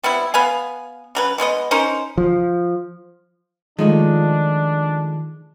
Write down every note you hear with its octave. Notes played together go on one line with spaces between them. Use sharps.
G3 B3 C4 E4
B3 B4 F5 G#5
C#3 F#3 B4
B2 G#3 B3 D#5
C#4 D#4 A#4 C5
F3
D#3 F3 G#3 A3 D4 F4